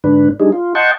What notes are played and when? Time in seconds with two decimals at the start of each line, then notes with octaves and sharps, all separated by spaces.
0.04 G#2 D3 D4 B4
0.40 G3 D4 D#4 G#4
0.52 F4
0.75 D#5 F#5 G5 A5 C6 C#6